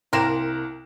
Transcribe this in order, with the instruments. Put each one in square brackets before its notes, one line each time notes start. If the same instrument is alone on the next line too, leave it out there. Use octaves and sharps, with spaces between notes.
[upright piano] C2 E7 [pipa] A#3 C4 A#4